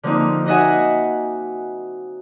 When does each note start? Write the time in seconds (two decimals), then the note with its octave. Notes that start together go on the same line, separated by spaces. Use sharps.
0.03 D3 F3 A#3 C4 D#4
0.46 D#4 F#4 D#5 E5 F#5 G#5